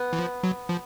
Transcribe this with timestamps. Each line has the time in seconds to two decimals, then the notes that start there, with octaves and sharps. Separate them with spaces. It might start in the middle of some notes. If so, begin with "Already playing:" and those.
Already playing: B3
0.13 E3
0.18 F3
0.43 F#3
0.69 F3